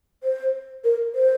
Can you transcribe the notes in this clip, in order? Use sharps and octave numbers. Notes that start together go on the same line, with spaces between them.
C5
A#4
C5